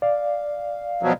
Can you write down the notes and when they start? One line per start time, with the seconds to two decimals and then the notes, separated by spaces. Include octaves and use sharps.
0.02 D5 F5
1.03 B2 F3 F#3